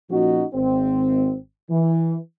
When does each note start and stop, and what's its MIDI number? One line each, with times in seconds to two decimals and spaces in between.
0.10 0.44 46
0.10 0.44 53
0.10 0.44 58
0.10 0.44 61
0.10 0.44 63
0.10 0.44 66
0.54 1.36 32
0.54 1.36 60
1.70 2.16 52